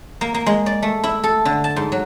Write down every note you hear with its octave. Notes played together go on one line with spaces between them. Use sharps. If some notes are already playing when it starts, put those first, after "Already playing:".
A#3
A#3
G#3
D5
A3
E4
A4
D3
A5
G#2
F#3